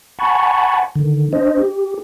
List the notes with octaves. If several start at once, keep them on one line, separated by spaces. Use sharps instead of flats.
F#5 G#5 A5 B5 C#6
D3 D#3
D4 C5 D#5
G4